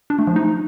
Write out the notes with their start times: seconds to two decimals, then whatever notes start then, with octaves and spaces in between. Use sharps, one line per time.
0.10 D4
0.19 A3
0.27 F3
0.36 D#4